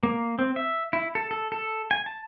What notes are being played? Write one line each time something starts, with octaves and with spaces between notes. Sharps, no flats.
A#3
C4
E5
E4
A4
A4
A4
G#5
A5